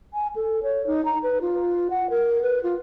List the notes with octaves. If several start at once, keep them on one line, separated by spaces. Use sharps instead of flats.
G#5
A4
C#5
D#4
A#5
B4
F4
F#5
A#4
B4
F4